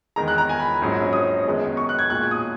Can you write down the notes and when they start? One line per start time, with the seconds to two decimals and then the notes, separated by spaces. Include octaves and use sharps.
0.16 E2 D#3 G#3 A#5
0.28 F#6
0.38 A#5
0.49 G#5
0.60 B5
0.82 A#1 G#2 F#3 C#4
1.13 D#6
1.46 F#2 D#3 G#3 B3
1.77 C#6
1.89 F#6
1.99 G#6
2.09 B1 A#2 G#3 F#6
2.31 D#6